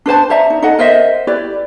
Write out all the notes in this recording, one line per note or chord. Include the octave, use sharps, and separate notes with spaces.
D4 B4 C5 A5
C5 D5 E5 A#5
D#4
D#4 A4 D#5 F#5
A#4 C5 D#5 E5
E4 G4 B4 D5